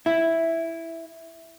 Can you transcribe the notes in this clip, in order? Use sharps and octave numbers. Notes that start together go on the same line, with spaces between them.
E4